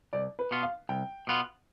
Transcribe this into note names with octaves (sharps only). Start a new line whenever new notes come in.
C2 D5
B4
B2 B3 F4
F5
C2 G5
B2 B3 F4